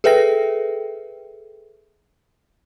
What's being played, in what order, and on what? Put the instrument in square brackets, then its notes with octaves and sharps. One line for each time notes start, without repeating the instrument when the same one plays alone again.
[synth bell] G#4 A4 B4 E5 G5 A#6